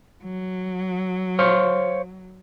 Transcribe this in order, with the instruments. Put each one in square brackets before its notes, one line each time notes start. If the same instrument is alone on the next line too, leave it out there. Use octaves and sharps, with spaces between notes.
[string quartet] F#3
[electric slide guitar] C5 C#5 F5